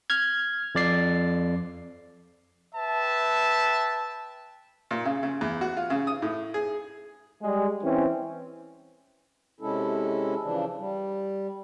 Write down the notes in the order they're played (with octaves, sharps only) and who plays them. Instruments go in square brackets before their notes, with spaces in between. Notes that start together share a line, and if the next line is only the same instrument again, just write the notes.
[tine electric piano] F6 G#6
F2 D5 C7
[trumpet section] B4 E5 G5 A5
[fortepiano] A#2
C#3
C#3
E2
F#4
F4
C#3
D#6
A2
G#4
[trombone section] G3 G#3
E3 C4 C#4
[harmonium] C3 G#3 C#4 E4 A4
C#3 E3 F3 D4
G3